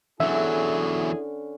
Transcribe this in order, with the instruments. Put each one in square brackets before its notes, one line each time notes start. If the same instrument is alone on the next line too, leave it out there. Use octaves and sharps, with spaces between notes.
[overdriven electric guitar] E2 F#3 [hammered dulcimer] D3 C#4 [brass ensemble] E4 G#4 [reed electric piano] E5